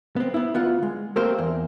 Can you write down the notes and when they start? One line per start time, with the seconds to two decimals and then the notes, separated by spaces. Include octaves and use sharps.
0.16 B3 C4
0.34 B3 E4
0.54 D2 B3 F4 F#5
0.82 G#3
1.16 A3 A#3 C4 G4 A#4 C5
1.38 E2